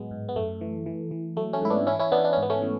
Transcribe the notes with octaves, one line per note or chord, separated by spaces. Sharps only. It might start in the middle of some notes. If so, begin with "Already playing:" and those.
Already playing: A2 F#3 G#3 B3
G#2
B3
F#2 A3
E3
E3
E3
F#3 A3
A3 C#4
G#2 E4
B3 D4
E3 C#4 E4
C#4 E4
E3 B3 D4
D4
C#4
G#2
B3
A3 C#4
E3